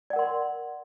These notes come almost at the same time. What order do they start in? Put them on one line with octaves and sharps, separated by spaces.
D5 F#5 A#4 C6